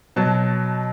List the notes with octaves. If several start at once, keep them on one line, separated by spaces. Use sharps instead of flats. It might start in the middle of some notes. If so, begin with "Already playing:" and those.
B2 F#3 A5